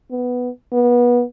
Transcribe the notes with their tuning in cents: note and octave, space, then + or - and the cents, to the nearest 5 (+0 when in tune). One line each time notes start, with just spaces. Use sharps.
B3 +5
B3 -25